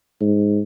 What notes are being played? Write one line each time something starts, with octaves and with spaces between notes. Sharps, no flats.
G#2